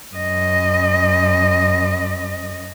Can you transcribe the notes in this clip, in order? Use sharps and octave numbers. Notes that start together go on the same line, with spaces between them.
F#2 D#5